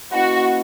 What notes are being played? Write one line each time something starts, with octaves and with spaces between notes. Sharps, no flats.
A#3 C#4 E4 F#4 B4 D#5